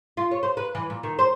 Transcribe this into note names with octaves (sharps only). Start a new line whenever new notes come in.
F4
C#5
C5
B4
E3
A#2
D#3
C5